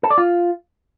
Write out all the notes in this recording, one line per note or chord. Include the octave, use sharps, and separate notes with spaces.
A4
D5
F4